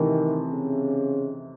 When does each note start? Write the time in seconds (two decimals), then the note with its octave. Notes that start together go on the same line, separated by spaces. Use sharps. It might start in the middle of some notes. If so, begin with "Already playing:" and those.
Already playing: C3 D#3 E3 A3 D#4
0.52 C#3